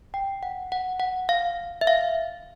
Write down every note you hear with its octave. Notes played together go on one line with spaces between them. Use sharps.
G5
F#5
F#5
F#5
F5
E5
F5